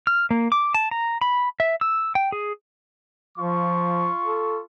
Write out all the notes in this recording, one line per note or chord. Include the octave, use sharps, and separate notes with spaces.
F6
A#3
D6
A5
A#5
B5
E5
E6
G5
G#4
F3 F4 C#6
A4